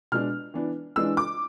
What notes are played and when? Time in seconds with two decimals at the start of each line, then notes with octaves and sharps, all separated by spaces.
0.12 B2 G#3 D4 F6
0.54 E3 B3 D4
0.96 E3 G#3 D4 E6
1.17 D6